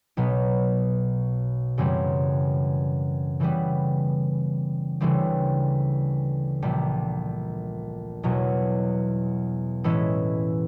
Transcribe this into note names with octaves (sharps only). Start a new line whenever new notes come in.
B1 B2 F#3 B3
F#2 C#3 E3 G3 C4
C#3 E3 G3 B3
D2 C#3 E3 G3 C4
A#1 A#2 G3
E1 E2 B2 F#3
A2 E3 G#3 C#4 E4